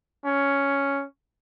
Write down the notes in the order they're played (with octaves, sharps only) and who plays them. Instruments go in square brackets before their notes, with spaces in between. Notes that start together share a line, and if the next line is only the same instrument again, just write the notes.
[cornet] C#4